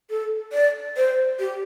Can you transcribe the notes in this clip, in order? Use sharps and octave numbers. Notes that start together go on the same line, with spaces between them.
A4
D5
C5
G4